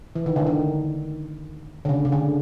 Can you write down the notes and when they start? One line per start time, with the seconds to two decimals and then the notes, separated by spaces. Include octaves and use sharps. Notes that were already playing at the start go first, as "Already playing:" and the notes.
0.16 E3
0.26 D#3
0.36 D3
0.46 D#3
1.85 D3
1.89 C#3
2.05 C#3
2.12 D3